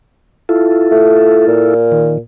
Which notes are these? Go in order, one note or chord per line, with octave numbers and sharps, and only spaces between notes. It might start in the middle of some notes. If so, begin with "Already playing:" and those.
E4 F4 A4
A3
A#2
D#3